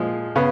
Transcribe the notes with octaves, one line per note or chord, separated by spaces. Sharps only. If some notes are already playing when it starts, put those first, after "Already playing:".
Already playing: A#2 F3 G#3
C#3 B3